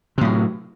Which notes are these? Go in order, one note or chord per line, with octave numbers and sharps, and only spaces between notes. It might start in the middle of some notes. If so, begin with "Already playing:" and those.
A2 C3 F#3